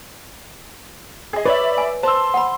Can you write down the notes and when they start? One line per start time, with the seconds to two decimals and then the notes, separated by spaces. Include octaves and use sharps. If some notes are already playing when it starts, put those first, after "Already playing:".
1.33 G#4 D#5
1.46 B4 C#5 D5 E5 B5
1.78 G#5
2.03 C5 A5 C6 E6
2.34 F#5 B5